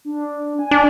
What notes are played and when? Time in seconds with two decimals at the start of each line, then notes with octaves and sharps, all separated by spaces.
0.05 D4
0.59 G#5
0.71 D4